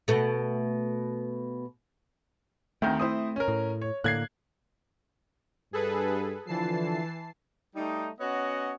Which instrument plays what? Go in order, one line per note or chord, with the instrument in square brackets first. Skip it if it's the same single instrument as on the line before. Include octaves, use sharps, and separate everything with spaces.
[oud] B2 A3
[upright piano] D2 D#3 G6 [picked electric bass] A3 C4
[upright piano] E4 C5 D#6
C#4 A#4
[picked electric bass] A2
[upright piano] C#5
[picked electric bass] A2 D3 A#3 [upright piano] F#6 G#6 C7
[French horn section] G2 [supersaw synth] G#4 A4 B4
[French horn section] D3 F3 [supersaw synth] E3 A5 C7
[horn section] G3 A3 D#4
B3 C#4 F#4 C#5 D#5